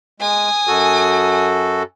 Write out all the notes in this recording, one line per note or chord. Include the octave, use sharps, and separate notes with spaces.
G#3 G#5 D#6
F#2 F#4 A4